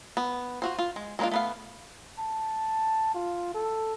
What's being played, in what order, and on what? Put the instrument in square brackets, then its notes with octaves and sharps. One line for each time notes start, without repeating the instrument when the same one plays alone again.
[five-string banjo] B3
F4 F#4 C5
F4
G#3
G#3 A#3 B3 D4 F4
A3 B3 F5
[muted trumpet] A5
F4
A4